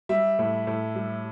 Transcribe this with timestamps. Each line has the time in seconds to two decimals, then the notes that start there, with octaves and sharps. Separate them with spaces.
0.09 G3 E5
0.39 A2
0.67 A2
0.95 G3